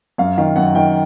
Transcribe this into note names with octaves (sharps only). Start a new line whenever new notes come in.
F#2 F5
D#3 F5
F#2 F#5
D#3 G5